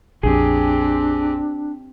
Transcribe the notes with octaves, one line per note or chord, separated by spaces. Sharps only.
A#1 F2 C4 D4 G4 G#4